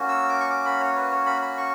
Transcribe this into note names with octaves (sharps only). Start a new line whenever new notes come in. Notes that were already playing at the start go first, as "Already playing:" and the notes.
Already playing: A#3 C#4 F#4
E6
D6
C#6
D6
B5
C#5
B4
C#5
B5
B5
C#6